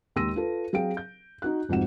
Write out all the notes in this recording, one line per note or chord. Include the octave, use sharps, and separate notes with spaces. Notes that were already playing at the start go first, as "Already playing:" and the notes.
D#2 G#3 C6 E6 A#6 D#7
F4 A4 B4
F#3 C4 G#4 F5 G5 D7
G6
D#4 F#4 F#6
F1 G#2 F3 F#4 F#5 E7